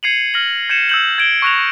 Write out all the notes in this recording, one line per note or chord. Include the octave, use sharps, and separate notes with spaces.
G#6 C7 C#7 D#7 F7 F#7
F6 A#6 F#7
G6 G#6 C7 C#7 D#7 E7
E6 G6 F#7
G#6 D7 G7
C#6 E6 F#6 A#6 E7 F7